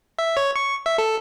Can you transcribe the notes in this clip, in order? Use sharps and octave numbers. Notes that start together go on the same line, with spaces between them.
E5
C#5
C#6
E5
A4